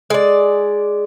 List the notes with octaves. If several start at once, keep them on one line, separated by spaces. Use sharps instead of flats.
G#3 D5